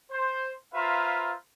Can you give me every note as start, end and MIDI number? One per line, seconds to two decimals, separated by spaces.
0.11 0.51 72
0.74 1.33 65
0.74 1.33 71
0.74 1.33 72
0.74 1.33 76
0.74 1.33 77
0.74 1.33 82